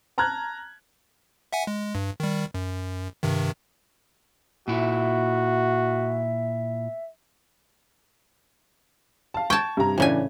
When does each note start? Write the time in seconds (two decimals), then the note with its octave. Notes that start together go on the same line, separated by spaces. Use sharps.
0.18 A5 A#5 F6 F#6 G#6
1.53 E5 F#5 G#5
1.67 G#3
1.95 G2
2.20 D#3 G3
2.54 F#2
3.23 G2 C3 D#3
4.68 A#2 E4 F#4 E5
9.34 F5 A5
9.50 G5 A5 C#6 G#6
9.77 G2 C3 A#5
9.98 A2 C#3 E3 D4 G#5